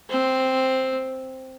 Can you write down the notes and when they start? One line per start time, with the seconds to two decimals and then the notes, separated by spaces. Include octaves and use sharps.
0.10 C4